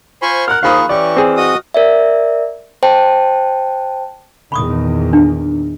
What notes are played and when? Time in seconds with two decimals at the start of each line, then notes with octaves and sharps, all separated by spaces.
0.22 F4 C5 G#5 B5 C#6
0.48 A#4 F#5 F6 F#6
0.63 D#3 F3 A#3 G#4 F5 B5 C#6 D#6
0.89 E3 C#4 G4 D5 C#6
1.17 C4 G#4
1.37 F#4 D#5 D#6
1.74 A#4 D5 E5
2.83 C5 G5 A5
4.52 E2 A#2 D#3 B5 C#6 D#6
5.13 D4